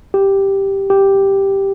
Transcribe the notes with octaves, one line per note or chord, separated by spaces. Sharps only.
G4
G4